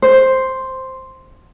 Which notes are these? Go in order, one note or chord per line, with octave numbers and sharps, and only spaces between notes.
C5